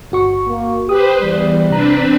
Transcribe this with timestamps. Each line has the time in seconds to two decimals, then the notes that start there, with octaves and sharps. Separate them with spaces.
0.12 G1 F#4 C#6
0.49 A#3
0.89 G4 B4 C5 D#6
1.21 E2 G3
1.70 C3 C4 D4 B4 A#5